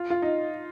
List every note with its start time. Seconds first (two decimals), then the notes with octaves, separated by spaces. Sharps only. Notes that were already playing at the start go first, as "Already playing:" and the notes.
Already playing: F4
0.10 F4
0.22 D#4